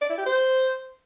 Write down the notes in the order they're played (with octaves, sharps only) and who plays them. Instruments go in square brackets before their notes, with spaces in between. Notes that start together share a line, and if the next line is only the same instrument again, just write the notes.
[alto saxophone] D5
E4
G4
C5